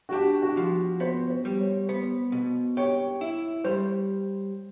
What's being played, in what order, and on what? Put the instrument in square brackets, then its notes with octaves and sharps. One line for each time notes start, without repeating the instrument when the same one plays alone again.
[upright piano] F#4
[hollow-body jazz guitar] D4 [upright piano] G4
[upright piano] F#4
[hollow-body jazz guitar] F3
[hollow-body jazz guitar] B3 [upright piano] C5
[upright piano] C5
[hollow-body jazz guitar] G3
[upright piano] C#5
[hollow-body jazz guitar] B3 [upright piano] C5
[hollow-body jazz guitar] B2
[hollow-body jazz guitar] G4 [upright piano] C#5
[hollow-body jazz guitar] E4
[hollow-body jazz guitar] G3 [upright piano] C5